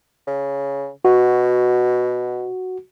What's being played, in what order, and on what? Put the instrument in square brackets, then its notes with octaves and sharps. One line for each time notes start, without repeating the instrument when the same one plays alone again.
[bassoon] C#3
[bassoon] B2 [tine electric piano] F#4